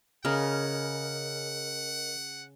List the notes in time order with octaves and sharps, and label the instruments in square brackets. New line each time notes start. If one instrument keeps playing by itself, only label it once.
[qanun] C#3 [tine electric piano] A#4 D#5 F6 [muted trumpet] F#5